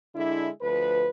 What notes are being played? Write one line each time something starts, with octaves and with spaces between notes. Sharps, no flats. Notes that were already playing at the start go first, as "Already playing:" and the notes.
D3 G#3 D4 E4
D2 F3 B4